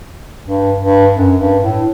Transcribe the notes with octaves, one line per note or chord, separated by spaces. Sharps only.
G2
G2
F#2
G2
A2